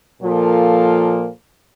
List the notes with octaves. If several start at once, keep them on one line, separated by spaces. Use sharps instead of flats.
A#2 F3 A#3 F4 A4